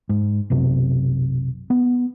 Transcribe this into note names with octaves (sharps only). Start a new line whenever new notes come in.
G#2
B1 F#2 C3
B3